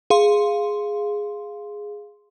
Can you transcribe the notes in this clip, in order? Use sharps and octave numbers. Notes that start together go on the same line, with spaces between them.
G#4 F5 C6